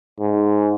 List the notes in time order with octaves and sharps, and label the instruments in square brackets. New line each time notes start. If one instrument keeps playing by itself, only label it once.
[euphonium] G#2